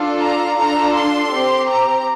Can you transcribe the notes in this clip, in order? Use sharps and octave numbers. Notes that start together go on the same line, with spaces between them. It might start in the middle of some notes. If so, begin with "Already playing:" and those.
Already playing: D4 F4 A4
A#5
D4 F4 A4 A#5
C6
C4 G4
A#5